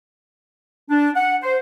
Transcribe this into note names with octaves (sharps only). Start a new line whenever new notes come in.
D4
F#5
C5